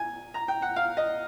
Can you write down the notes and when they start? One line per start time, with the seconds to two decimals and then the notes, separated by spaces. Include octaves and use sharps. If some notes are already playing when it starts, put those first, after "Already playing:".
Already playing: G#5
0.34 A#5
0.48 G5
0.62 F#5
0.76 F5
0.97 D#5